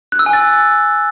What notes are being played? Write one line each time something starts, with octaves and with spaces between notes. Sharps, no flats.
F#6
E6
G#5
A6